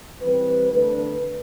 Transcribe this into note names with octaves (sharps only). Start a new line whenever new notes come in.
E3 G3 C4 B4
D3 A3 D4 B4